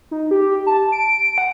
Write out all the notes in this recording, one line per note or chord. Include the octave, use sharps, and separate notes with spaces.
D#4
G4
A5
D7
F#5